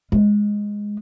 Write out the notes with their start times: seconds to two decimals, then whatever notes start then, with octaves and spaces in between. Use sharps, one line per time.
0.12 G#3